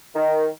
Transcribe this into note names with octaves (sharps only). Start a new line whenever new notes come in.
D#3